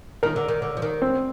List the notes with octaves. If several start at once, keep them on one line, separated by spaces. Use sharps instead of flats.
D#3 A#4
D3
D#3
D3
F3
D#3
C4